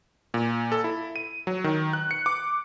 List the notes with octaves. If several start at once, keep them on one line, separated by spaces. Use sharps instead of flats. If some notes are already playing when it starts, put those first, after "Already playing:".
A#2
A4
E4
D#7
F#3
D#3
F#6
C#7
D6